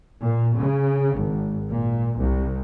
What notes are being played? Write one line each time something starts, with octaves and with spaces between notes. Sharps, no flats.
A#2
C#3
G#1
A#2
C2